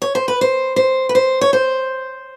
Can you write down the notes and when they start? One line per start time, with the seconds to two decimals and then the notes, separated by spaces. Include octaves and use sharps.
0.02 C#5
0.15 C5
0.28 B4
0.41 C5
0.76 C5
1.09 B4
1.15 C5
1.41 C#5
1.53 C5